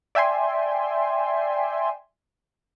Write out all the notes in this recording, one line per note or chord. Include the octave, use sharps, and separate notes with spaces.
D5 E5 G5 G#5 C6